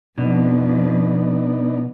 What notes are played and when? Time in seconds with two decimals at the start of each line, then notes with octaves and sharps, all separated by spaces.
0.18 F2 B2 B3 D4 D#4